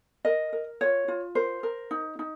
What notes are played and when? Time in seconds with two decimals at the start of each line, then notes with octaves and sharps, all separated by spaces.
0.25 A#4 D#5
0.53 A#4
0.81 F4 C#5
1.08 F4
1.35 A#4 C5
1.63 A#4
1.91 D#4
2.19 D#4